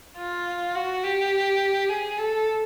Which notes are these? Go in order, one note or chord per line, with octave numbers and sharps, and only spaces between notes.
F4
F#4
G4
G#4
A4